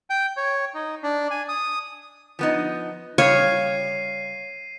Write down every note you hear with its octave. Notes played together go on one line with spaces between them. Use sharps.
G5
C#5
D#4
D4
G#5
D#6
F3 B3 D#4
C#3 G3 C#5 F5 C7 D#7